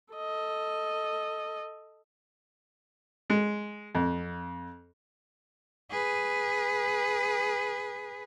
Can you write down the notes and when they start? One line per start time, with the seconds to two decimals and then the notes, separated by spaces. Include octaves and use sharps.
0.14 A4 D#5
3.30 G#3
3.95 F2
5.91 G#4 B4